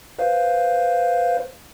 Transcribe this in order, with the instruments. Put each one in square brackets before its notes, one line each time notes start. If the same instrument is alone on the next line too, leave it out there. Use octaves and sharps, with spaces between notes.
[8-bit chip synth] B4 C5 F5